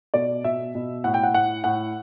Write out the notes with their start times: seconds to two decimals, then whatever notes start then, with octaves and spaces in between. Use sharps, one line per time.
0.14 B2 D5
0.44 B2 E5
0.75 B2
1.04 A2 F#5
1.14 G5
1.23 F#5
1.34 A2 F#5
1.64 A2 F#5